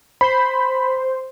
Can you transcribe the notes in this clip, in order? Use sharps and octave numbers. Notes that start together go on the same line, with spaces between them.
C5 B5